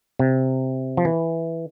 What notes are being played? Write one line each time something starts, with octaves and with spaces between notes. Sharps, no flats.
C3
F3
E3